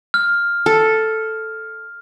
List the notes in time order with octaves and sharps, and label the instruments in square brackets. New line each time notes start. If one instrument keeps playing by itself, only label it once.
[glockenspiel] F6
[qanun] A4